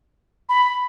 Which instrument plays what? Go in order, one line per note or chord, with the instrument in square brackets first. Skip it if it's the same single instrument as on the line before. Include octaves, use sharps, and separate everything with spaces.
[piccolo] B5